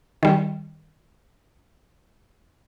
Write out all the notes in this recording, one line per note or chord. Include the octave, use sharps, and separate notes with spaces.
D#3 G3